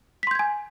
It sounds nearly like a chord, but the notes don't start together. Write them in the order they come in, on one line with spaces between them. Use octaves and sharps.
B6 C6 G6 G#6 G#5